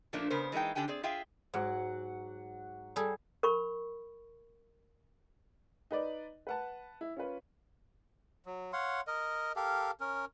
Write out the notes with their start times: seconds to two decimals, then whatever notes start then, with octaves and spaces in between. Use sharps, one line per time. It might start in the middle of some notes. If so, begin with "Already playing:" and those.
0.13 A#2 F3 A3 A#3 D4
0.30 C#3 B3 A#4 C5
0.52 E3 G#3 A#3 D#4 G5
0.75 D3 D4 G4 G5 G#5
0.88 C4 G#4 D5
1.03 F4 G#4 E5 F5 G5
1.54 G#2 F#3 F#5 D6
2.96 G3 G#4 A4
3.43 A#4 B5 C#6
5.91 D#4 B4 D5
6.47 B4 F#5 A5
7.01 E4
7.17 C#4 F4 B4
8.46 F#3
8.73 C#5 F5 F#5 C6
9.07 A#4 D#5
9.56 G4 A4 A#4 F5
10.00 C#4 A#4